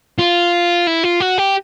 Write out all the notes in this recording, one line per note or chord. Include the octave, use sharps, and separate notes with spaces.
F4
E4
F4
F#4
G4